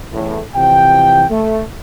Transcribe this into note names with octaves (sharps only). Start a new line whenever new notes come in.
A1 E2 A2
C3 E3 F3 G5
A3